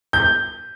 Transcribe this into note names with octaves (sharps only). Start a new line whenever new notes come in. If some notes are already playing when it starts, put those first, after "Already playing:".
G6